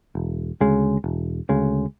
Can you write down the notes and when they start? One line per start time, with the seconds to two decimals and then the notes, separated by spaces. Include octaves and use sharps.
0.15 E1
0.60 D2 C#3 G#3
1.04 E1
1.49 D2 C#3 G#3